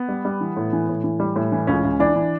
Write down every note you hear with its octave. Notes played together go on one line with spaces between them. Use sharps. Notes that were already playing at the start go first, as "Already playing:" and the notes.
Already playing: B3
G3
G3
E3
A2
E3
A2
E3
G3
A2
E3
C#2 C#4
C#2
E3 D4
E3